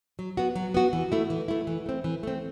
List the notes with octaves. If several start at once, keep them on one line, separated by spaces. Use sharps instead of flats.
F#3
B3 F#4
F#3
B3 F#4
E3
A3 E4
E3
A3 E4
E3
A3 C4
E3
A3 C4